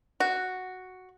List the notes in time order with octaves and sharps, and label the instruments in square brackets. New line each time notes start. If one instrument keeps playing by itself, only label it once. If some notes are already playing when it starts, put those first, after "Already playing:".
[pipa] F#4